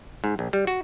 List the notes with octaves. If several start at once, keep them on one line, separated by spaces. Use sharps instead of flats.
G#2
A#1
G3
F#4